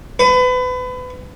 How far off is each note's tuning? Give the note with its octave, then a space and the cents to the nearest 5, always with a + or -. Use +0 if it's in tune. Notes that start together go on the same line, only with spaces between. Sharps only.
B4 +30